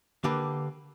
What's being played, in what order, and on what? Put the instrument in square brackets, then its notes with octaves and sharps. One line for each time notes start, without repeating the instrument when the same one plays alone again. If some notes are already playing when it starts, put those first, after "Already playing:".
[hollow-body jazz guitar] D3 A#3 G4 B4